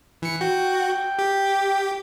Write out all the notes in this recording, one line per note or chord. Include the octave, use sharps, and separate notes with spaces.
E3 C#7
F#4 G5
G4